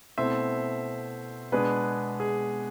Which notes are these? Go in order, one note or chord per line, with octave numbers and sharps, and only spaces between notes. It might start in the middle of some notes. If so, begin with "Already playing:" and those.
B2 A3 C4 E4 C5 E5
B2 G#3 B3 D4 G#4 B4
G#4